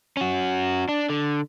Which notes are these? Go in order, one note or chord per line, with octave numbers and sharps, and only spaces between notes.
C#4 F#4
D4
D3